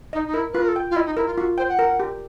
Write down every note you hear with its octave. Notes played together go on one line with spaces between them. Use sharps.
D#4 D#5
D#4
E4 A#4
F4 B4
A#4
A4
G5
F4
E4 D#5
D#4
E4 A#4
F4
F4 F#4
C5 G5
F#5
A#4
G4